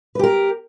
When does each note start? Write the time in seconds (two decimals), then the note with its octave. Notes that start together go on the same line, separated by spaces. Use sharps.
0.15 B4
0.19 G4
0.24 A#4